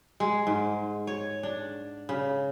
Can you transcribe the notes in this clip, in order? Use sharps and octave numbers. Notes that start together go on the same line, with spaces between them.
G#3
G#2
C#5
D4
C#3